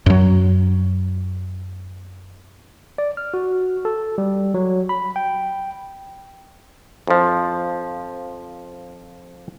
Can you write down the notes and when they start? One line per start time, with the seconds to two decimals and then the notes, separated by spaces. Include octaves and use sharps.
0.06 F#2 F#3
2.98 D5
3.17 F6
3.34 F#4
3.85 A4
4.18 G3
4.54 F#3
4.89 B5
5.16 G5
7.07 F2 F3